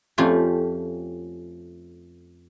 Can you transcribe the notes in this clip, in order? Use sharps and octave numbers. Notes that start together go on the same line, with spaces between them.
F2 A3 C#4 F4 G4 F5